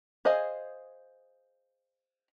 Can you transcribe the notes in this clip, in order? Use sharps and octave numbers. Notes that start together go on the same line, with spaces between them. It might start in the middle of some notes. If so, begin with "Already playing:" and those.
G#4 C5 D#5 F5 G#5